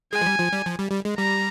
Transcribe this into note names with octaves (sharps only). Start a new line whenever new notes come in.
G#3 G#5
F3
G3
F3
G3
F3
G3
G3
G#3
G3 A#5